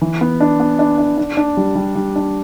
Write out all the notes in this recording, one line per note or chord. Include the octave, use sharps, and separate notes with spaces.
E3
B3
D4
B3
D4
D4
D4
D4
G3
G3
G3
D4